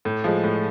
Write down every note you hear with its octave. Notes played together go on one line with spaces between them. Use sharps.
A2
F3 G#3
A2